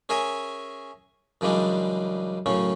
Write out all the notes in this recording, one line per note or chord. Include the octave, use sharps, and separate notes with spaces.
C#4 G#4 A#4 E5 G#5
F#2 C#3 E3 G3 G#3 D4
F#2 A2 C#3 C#4